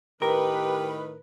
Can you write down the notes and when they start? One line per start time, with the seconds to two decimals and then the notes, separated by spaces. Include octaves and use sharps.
0.22 A2 D#3 G4 A#4 B4